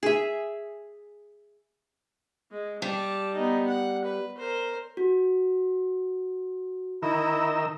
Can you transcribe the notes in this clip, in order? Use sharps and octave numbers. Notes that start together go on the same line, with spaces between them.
G#4 E5
G#3
G3 G4 A5
B3 D#4
F#5
B4
A#4 C5
F#4
D#3 E4 A#4 E6